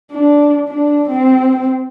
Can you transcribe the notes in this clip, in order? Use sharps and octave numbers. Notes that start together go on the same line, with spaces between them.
D4
D4
C4